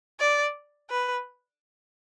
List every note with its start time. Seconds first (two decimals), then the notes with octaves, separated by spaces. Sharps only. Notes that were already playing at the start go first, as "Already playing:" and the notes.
0.20 D5
0.90 B4